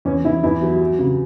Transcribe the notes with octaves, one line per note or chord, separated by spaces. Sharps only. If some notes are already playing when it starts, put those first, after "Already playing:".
E2 C#4
E2 E4
E2 E4
F#3
F#3
C#3